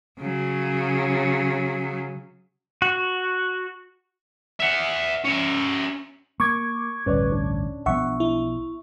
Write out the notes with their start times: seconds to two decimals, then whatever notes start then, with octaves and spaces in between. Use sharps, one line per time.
0.20 C#3 F#3
2.82 F#4
4.60 E5 F#5
5.25 C#4 E5
6.40 A#3 C#6 D6 G#6
7.06 A1 D2 G2 C#4 B4 C#5 D5
7.32 D4
7.86 B1 F3 B3 E5 F#5 C#6
8.20 E4